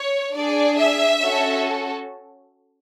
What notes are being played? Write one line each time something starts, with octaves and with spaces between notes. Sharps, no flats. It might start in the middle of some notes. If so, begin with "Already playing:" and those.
Already playing: C#5
D4 G#4 D5
E5
C#4 F#4 A4